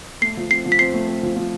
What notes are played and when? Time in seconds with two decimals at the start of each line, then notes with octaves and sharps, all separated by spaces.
0.22 A3 C7
0.37 F3
0.50 C4 C7
0.66 F3
0.72 B6
0.79 C4 C7
0.94 A3
1.08 C4
1.23 F3
1.36 F3